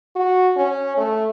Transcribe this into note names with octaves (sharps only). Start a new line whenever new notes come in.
F#4
C#4
A3